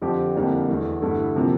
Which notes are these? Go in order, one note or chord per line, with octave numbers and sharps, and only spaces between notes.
F2 D3 F3 C4 G4
F2 D3 G3 A#3 E4
E2 E3 A3
G2 D3 A3 E4
C3 F3 A#3